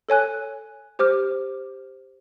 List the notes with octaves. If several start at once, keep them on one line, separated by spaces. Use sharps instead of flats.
A4 C#5 G#5 F#6
G4 C5 D6 F6